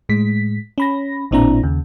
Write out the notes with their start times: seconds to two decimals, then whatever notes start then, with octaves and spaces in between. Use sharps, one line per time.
0.09 A2 G#3 B6
0.78 C#4 B5 A#6
1.31 A1 A#2 C4 D4 E4 A#5
1.63 D#2 C#3